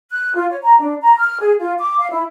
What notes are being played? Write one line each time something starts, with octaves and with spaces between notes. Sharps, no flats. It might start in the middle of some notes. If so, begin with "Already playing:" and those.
F#6
F4
C#5
A#5
D4
A#5
F6
G#4
F4
D6
F5
E4